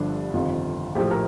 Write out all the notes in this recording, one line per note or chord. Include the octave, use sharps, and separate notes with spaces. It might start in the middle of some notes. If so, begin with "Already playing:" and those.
Already playing: G1 G2 D3 F3 D4
G1 F2 C3 D#3 F4
A#1 A2 F3 G4
A#4